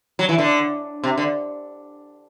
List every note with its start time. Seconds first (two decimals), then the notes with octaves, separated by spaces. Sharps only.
0.19 F#3
0.29 E3
0.38 D3
1.04 C3
1.18 D3